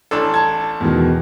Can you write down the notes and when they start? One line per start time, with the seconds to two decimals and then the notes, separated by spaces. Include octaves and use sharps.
0.11 A1 D4 A4
0.34 A5 G#6
0.80 E2 B2 D#3